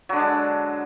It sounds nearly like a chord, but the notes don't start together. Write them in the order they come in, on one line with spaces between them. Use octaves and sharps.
F#3 D3 D4 G#3